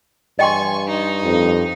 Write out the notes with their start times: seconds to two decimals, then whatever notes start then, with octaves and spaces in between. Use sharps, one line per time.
0.39 G2 D#5 G5 G#5 C6 C#6
0.87 D#4
1.24 F2